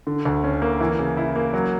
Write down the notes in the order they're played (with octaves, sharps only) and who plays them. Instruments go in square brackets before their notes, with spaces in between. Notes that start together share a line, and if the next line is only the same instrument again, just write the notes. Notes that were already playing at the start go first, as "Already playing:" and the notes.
[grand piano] D3
D2
C#4
A#3
E3
C#3
E4
A#3
F#3